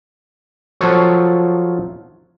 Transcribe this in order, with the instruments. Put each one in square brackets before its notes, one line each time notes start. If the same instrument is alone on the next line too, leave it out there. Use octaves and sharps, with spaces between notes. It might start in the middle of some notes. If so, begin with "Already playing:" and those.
[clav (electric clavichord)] F3 F#3 F4 A4 C5 C#5